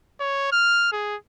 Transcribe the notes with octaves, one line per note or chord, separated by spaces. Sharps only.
C#5
F6
G#4